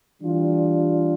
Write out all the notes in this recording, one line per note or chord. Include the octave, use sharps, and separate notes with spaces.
E3 G3 D4 F4